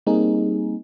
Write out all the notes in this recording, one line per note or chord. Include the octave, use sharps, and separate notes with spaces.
G3 A#3 C4 D#4 G#4